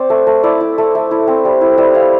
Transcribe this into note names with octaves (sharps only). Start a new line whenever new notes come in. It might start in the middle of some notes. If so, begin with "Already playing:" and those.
Already playing: C4 C5 D5
A3
A3
E4 D5
E4
A3
A3
E4
C4
G3
E4
G3 E5
E4 F5